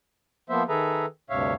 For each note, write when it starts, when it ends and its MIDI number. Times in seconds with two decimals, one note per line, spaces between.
0.49 0.63 53
0.49 0.63 58
0.49 0.63 59
0.49 0.63 72
0.49 0.63 76
0.69 1.06 51
0.69 1.06 68
0.69 1.06 69
0.69 1.06 71
0.69 1.06 76
0.69 1.06 82
1.30 1.54 38
1.30 1.54 43
1.30 1.54 48
1.30 1.54 73
1.30 1.54 76
1.30 1.54 77